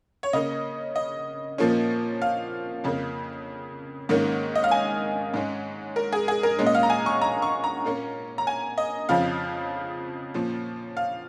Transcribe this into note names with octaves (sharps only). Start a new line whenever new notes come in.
C#5
C#3 A#3 C#4 D#5
D#5
A#2 F3 A#3 C#4
F5
F2 C#3 A#3
G#2 D#3 A#3 C#4
D#5
F5
G#5
G#2 G#3 C#4
A#4
G#4
G#4
A#4
A#2 G#3 C#4
D#5
F5
A#5
G#5
C#6
A#5
C#6
A#5
A#2 A#3 C#4
A#5
G#5
D#5
F2 C#3 F3 F5
A#2 F3 C#4
F5